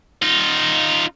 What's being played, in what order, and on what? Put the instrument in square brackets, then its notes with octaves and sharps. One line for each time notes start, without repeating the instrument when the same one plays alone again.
[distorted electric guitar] D#4 F4